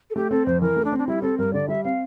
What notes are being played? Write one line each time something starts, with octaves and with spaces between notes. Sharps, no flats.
A4
A3 G4
C4 A4
F2 C5
E3 A#4
A3
D4
C4
D4
G3 E4
C4 A4
G2 A#4
D3 D5
G3 E5
C4 F5